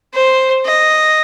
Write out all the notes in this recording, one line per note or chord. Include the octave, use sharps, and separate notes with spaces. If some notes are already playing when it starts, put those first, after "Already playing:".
C5
D#5